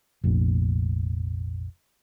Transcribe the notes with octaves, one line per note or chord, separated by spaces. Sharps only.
F1 A#1